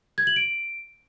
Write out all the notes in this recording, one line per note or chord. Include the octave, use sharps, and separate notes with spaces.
G#6
F#7
D7